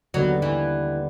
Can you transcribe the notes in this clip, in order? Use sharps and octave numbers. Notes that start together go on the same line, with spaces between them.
D#2 D3 F#3 G3 B3
E3